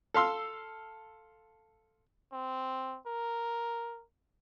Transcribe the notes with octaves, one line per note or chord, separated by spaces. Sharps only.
A4 F5 C6 E6
C4
A#4